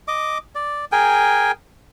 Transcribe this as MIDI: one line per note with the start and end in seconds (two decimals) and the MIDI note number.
0.08 0.38 75
0.08 0.38 86
0.55 0.85 74
0.92 1.52 68
0.92 1.52 70
0.92 1.52 79
0.92 1.52 80